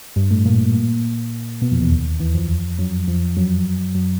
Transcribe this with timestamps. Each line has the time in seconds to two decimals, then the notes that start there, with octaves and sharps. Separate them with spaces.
0.16 G2 G3
0.31 A2 A3
0.45 A#2 A#3
1.62 B2 B3
1.71 F2 F3
1.81 E2 E3
1.91 D#2 D#3
2.20 E2 E3
2.34 F2 F3
2.78 F#2 F#3
3.07 F2 F3
3.37 F#2 F#3
3.95 F#2 F#3